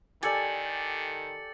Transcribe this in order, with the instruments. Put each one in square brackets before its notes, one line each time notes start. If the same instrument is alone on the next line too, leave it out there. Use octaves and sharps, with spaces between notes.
[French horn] D#3 [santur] G4 A4 D5 [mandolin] G#5 [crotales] A6 C#7 F#7